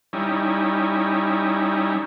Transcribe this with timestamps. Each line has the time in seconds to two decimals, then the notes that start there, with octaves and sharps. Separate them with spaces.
0.13 G3 C#4 D#4 E4